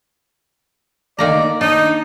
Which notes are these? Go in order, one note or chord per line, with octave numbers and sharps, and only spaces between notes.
D#3 A#3 D5 A#5
D4 D#4